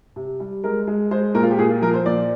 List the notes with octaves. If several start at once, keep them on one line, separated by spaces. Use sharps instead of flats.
C3
G3
G#3 A#4
G#3
G#3 C5
A#2 A#4
F4
G4
A#2 G#4
F4
F3 A#4
C5
A#2 D5